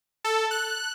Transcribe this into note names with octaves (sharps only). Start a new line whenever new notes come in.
A4
F#6